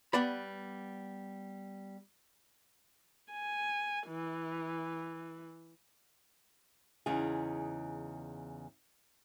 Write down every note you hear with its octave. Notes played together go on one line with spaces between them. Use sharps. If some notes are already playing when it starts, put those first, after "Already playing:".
G3 B3 D5 B5
G#5
E3
E2 C#3 D#4 G#4